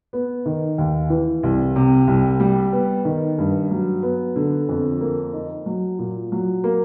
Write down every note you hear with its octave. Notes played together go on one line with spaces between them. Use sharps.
B3
D#3
D#2
E3
C2
C3
C2
G3
B3
D#3
G2
F#3
B3
D3
F2
A#3
D#4
F#3
A#2
F#3
A#3